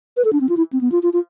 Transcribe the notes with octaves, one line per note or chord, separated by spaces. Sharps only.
B4
A4
D4
C4
F4
E4
C4
B3
F4
F4
F4